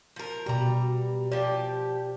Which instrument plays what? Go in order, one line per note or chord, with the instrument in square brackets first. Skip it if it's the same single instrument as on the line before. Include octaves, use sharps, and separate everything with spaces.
[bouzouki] F3 A#4
[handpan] B2 G4 [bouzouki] G3 A#5
[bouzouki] F3 G4 [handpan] D5